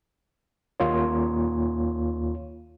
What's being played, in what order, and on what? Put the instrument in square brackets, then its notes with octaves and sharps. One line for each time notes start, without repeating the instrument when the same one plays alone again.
[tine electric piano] D#2 A#3 F4 C#5